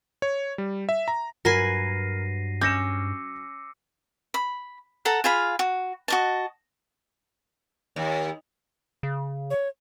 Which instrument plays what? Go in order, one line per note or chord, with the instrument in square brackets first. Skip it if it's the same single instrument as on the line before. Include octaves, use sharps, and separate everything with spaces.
[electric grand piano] C#5
G3
E5
A#5
[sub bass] G2 [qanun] F#3 B4 G#5 [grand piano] A#4 [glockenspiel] A#6 C7 D#7
[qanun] C#4 [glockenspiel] D6 E6 C#7 [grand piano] G6 A#6 E7
[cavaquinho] B5
A4 F#5 A#5
F4 G#4 F5 B5
F#4
F#4 D#5 A5
[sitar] D#2
[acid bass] C#3
[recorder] C#5